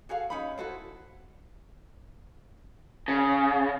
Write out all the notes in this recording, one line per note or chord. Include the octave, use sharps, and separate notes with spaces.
F#4 G#4 A4 F5
C#4 D#4 B5
E4 F#4 A4 C5
C#3